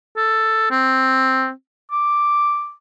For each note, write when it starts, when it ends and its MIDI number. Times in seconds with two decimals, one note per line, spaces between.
0.17 0.68 69
0.71 1.51 60
1.92 2.73 86